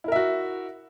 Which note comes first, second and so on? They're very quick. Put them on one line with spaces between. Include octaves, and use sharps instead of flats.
E4 A#4 E5 F#4